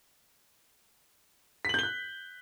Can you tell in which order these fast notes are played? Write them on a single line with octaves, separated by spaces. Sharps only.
B6 F#7 G6 G7 F#6